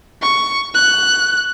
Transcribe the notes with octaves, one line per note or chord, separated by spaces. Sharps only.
C#6
F#6